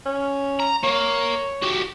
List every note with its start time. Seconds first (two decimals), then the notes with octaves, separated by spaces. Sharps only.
0.06 C#4
0.60 A#5
0.84 A#3 C#5
1.62 F#4 G4